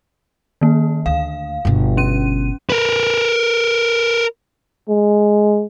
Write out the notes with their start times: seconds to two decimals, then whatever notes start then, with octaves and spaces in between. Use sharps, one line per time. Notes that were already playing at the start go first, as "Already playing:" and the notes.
0.61 D#3 A#3
1.06 D2 F5
1.65 G1 B2
1.97 C#4 D#7
2.70 A#4 B4
4.89 G#3